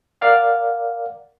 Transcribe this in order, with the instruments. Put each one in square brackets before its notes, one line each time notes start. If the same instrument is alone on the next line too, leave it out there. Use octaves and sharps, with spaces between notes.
[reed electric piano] A#4 D5 F5 F#5